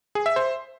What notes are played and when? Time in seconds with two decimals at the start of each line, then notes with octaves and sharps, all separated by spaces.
0.15 G#4
0.26 E5
0.36 C5